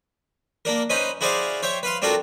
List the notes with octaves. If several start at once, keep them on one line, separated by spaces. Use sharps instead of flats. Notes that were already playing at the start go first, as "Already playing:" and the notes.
A#3 D4 A#4
C#4 D#4 B4 C5
E4 F#4 G#4 C5 D5 F5
C5 C#5 E5 G5
B4 F5 C6
C4 D4 F4 F#4 A4 A#4